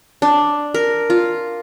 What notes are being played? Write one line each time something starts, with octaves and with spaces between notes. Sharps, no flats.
D4
A#4
F4